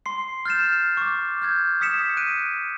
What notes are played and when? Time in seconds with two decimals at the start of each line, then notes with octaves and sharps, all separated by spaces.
0.06 C6 C7
0.46 F6 G6 A6 C7 E7
0.97 C#6 D6
1.42 F6 G6 G#6
1.81 D#6 B6 C#7 E7
2.17 F#6 D7 D#7